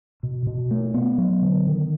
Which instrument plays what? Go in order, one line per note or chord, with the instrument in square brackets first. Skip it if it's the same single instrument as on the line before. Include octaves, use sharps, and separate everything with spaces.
[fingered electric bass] B2
B2
A3
B3
F#3
D3
D#3